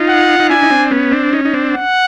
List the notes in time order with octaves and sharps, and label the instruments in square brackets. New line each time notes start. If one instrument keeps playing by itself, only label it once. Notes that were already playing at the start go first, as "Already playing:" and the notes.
Already playing: [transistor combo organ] D#4 F4
[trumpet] F#5
[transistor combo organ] D#4
[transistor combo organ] D4 E4 [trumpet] G#5
[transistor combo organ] D#4
C4 D4
B3 C#4
C4 D4
C#4 D#4
D#4
C4 D4
[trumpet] F#5